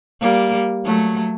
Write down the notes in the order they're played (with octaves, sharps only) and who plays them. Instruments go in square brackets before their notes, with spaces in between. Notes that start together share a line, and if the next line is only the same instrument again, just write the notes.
[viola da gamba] G3 A#3
F#3 A3